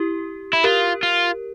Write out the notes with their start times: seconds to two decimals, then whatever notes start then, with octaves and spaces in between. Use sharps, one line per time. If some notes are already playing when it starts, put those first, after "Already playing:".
Already playing: E4 G4
0.53 E4
0.64 F4 G4 A#4
1.03 F4